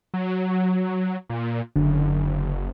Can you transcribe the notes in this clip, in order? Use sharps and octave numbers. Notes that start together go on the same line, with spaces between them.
F#3
A#2
F#1 D3